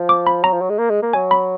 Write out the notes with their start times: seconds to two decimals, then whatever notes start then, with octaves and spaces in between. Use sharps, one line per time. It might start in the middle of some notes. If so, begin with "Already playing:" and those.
Already playing: F3
0.09 D6
0.27 B5
0.43 F#3 A#5
0.53 F3
0.61 F#3
0.70 G#3
0.79 A#3
0.90 G#3
1.02 A#3
1.13 F#3 G#5
1.31 B5